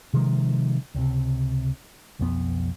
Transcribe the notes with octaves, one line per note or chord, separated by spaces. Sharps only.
C3 D#3 F3 G#3
C#2 C3
B1 F2 B3